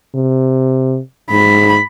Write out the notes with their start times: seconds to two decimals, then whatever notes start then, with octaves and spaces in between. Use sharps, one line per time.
0.15 C3
1.31 G#2 B5